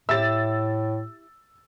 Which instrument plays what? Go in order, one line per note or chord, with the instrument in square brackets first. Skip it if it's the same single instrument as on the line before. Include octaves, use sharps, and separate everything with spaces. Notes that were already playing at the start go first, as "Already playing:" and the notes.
[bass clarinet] A2 [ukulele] E4 G4 E5 [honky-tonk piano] E6 A6